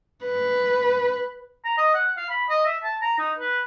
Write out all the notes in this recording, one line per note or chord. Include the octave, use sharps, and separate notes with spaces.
B4
A#5
D#5
F#5
F5
B5
D#5
E5
A5
A#5
D#4
B4